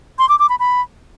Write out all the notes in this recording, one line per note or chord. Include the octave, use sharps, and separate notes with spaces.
C6
D6
D6
B5
B5